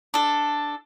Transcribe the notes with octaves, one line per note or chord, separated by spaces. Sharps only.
D4 A4